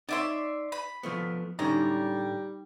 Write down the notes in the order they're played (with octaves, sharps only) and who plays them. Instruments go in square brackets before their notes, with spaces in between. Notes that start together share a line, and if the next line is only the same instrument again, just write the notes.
[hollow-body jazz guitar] D#4 C#5 [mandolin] D5 E5 C6
[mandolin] B5
[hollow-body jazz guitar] F3 A3 B3
[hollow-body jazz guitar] A2 D3 C#4 [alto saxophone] G3 [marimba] D#4 [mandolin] A#5